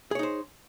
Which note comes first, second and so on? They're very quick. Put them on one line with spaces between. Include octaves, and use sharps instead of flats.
G#4 C#5 D#4 C5